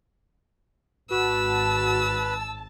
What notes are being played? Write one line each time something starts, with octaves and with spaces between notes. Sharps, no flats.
G#1 F#4 B4 A5 E6